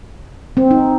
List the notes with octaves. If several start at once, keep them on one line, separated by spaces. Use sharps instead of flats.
C4
D#4